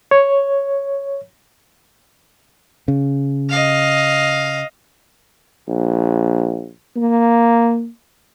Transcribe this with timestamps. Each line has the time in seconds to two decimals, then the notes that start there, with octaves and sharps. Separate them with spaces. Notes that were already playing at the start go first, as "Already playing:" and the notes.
0.11 C#5
2.88 C#3
3.50 D#5 F5
5.68 A#1
6.96 A#3